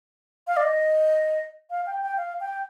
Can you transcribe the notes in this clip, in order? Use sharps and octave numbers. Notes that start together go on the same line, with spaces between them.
F5
D5
D#5
F5
G5
G5
F5
G5